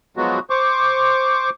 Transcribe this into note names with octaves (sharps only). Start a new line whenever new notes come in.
F3 F#3 G#3 B3 F#4
C5 C#6 D6